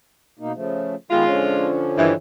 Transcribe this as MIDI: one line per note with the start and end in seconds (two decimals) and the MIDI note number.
0.39 0.52 47
0.39 0.52 58
0.39 0.52 63
0.55 0.95 49
0.55 0.95 53
0.55 0.95 57
1.11 1.24 51
1.11 1.69 56
1.11 1.24 59
1.11 1.69 65
1.11 1.24 67
1.25 2.14 50
1.25 2.14 53
1.25 2.14 61
1.97 2.12 43
1.97 2.12 51
1.97 2.12 52